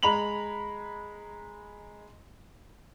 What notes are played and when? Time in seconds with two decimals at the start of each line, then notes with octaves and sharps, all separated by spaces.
0.03 G#3 A#5 B5 F7 F#7